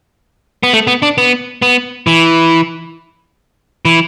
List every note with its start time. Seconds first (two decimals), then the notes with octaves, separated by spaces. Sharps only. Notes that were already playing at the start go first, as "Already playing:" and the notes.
0.63 B3
0.73 A3
0.87 B3
1.02 D4
1.18 B3
1.62 B3
2.07 E3
3.85 E3